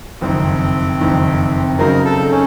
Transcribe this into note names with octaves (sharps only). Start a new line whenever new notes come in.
F#1 F2 D#3 C4
F#1 F2 D#3
C#3 F#3 C4 D#4 A#4
A4
C#4